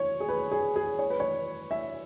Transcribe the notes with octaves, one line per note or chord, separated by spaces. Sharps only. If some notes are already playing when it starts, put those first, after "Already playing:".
Already playing: C#5
G#4
B4
G#4
G#4
C#5
B4
C#5
E5